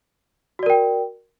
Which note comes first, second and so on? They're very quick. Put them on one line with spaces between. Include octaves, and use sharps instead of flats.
F#4 D5 A#4 G5